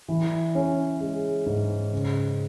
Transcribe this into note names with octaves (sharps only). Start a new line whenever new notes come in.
E3
C#4
G#3
G#2
C#3